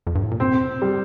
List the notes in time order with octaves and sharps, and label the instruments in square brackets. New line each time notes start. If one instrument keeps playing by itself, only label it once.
[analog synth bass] F2
G2
A2
A#2
[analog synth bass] C3 [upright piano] C4
[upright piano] G3